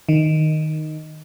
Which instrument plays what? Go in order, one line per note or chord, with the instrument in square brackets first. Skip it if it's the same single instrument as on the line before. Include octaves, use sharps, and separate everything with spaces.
[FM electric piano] D#3